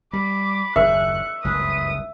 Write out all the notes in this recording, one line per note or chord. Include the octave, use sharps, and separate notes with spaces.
G3 B5 D6
F#1 D#2 E5 C#6 F#6
F#1 C#2 G2 B4 D#6